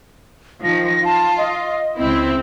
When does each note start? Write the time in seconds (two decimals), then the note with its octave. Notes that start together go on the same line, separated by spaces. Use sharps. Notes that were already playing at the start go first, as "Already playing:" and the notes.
0.64 D#3 F3 A#6
1.05 F4 A5
1.38 D#5
1.99 C#2 C4 E4